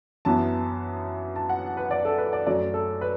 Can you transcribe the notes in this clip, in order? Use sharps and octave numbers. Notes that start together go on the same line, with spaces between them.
F#2 E3 B3 A5
A5
F#5
B4
D5
A4
B4
D5
F#2 F#3 A3 D5
A4
B4